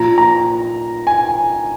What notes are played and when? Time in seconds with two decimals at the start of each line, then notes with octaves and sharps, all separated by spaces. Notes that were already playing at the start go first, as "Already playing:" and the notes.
Already playing: A#2 F3 A#5
0.18 A#5
1.07 G#5